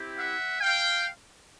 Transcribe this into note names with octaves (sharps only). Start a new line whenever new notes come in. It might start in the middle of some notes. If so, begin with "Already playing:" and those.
Already playing: C4 E4 G4
E5 F#5
F5 G5